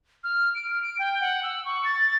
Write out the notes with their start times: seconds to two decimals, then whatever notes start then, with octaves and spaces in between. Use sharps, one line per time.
0.24 F6
0.55 D7
0.70 F6
0.82 D7
0.99 G5
1.21 F#5
1.43 E6
1.65 C#6
1.85 A6